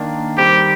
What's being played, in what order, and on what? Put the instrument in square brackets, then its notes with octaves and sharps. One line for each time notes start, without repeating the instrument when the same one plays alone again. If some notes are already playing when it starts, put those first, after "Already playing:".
Already playing: [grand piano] D#3 A#3 D4
[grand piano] D#3 G3 C4 [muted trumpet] G4